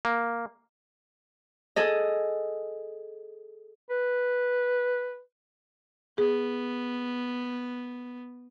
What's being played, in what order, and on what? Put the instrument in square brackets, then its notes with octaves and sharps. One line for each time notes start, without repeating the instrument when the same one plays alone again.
[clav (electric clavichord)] A#3
[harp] G#4 A4 D#5
[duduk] B4
[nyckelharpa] B3 [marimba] G#4